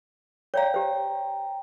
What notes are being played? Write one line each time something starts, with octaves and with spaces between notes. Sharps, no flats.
C#5 D5 F5 G5 A#5
G4 C5